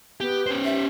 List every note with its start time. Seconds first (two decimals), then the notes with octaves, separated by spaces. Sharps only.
0.21 B3 G4
0.47 C#4 C5
0.65 G4 E5